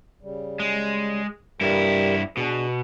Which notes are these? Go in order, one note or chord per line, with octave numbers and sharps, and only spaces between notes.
C#3 G3
G#3
G2 G3 E4 G4 A#4
B2 D4 G#4 B4